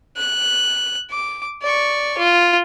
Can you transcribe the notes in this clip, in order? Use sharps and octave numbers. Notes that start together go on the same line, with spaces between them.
F#6
D6
D5 C#6
F4